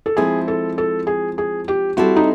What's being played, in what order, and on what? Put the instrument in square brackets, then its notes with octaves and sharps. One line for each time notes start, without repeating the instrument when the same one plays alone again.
[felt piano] A4
[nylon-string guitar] F3 G#3 C4 E4 [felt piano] G#4
[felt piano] A4
A4
G#4
G#4
G4
[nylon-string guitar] G3 C4 E4 A4 [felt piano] F#4
[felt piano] D#4